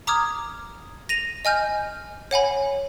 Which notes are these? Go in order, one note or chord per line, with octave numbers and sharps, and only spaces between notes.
A#5 D6 D#6 F6 G#6
A#6 D#7 F7
D#5 G#5 F6 G6
C#5 F#5 G#5 B5